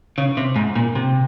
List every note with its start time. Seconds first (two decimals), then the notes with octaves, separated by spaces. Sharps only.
0.18 C#3
0.37 C3
0.56 G#2
0.76 A#2
0.95 C3